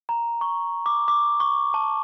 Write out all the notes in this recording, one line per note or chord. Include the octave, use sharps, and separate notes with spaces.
A#5
C#6
D6
D6
C#6
A5